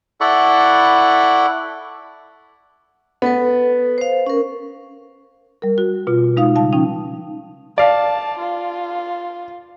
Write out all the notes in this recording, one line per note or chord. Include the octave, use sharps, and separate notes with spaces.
E4 A4 D5 F#5 B5 C#6
B3 A4 B4
C5 F5
C#4 A#4
G3 A#4
F#4
B2 F4
G#3 D#4 F5 D#6
C#3 G3 F5 A5
F3 C#4 D#4 G5
D5 F5 A5
F4